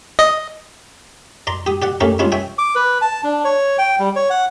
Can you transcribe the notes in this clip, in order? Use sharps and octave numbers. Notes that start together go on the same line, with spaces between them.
D#5
D5 A#5 C6
G4 D#6
G4 D5 F#5
A3 C#4 G4 A4 A#4
G3 G#3 C#4 D4 F4
C#5 E5 G5 G#5
D6
B4
A5
D4
C#5
G5
G3
C#5
F#5